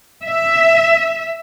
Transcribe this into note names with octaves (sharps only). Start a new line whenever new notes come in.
E5